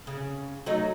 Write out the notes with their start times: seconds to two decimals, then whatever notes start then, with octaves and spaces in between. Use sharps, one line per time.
0.07 C#3
0.66 F#3 A3 D#4